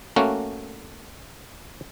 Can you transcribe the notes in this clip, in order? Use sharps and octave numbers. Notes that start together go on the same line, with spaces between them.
A3 A#3 C#4 F#4